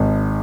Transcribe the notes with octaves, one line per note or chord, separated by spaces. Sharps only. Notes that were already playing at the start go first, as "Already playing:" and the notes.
Already playing: G#1 G#2